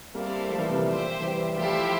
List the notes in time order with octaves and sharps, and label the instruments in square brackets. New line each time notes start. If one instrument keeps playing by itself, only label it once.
[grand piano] G3 A#3 [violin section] C4 E4 A4 C5 F5
[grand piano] F3 A3
E3 G3
C3
A#2
[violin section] G4 C5 E5
[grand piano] E3 G3
[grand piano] F3 A3 [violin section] E4 G4 C5